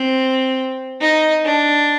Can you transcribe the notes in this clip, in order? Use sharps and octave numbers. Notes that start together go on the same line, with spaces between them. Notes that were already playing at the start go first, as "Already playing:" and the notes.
Already playing: C4
D#4
D4